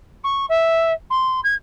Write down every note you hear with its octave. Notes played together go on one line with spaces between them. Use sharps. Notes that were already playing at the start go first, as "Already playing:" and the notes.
C#6
E5
C6
G#6